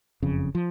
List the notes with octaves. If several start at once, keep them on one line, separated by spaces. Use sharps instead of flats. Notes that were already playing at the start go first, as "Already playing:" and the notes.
F#1 F2 C#3
F3